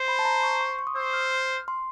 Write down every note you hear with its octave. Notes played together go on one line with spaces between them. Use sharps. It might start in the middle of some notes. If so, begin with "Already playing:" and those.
Already playing: C5
B5
A5
A#5
C#6
C#6
C6
C#6
D#6
C5 E6
F6
C6